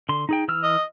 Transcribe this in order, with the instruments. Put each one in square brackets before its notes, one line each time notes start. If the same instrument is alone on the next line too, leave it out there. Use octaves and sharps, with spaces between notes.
[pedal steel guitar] D3 C6
D#4 G#4 G5
E3 E6 F6
[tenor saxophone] D#5